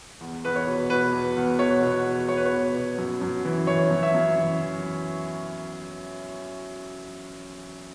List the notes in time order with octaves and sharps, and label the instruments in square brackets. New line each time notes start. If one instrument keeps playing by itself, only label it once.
[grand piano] E2
E2 B4
C#5
B2
B2 B4
E2
E2
B2 C#5
B2
E2
E2 C#5
B4
C#5
B2
B2
F#2
F#2
E3
E3 C#5
F#2
E5
F#2
E3
E3